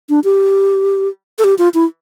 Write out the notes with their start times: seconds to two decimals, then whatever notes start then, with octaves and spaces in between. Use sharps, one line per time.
0.09 D4
0.24 G4
1.39 A4
1.44 G4
1.58 F4
1.74 E4